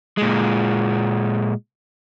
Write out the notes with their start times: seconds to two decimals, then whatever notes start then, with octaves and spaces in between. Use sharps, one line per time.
0.18 A#2 G#3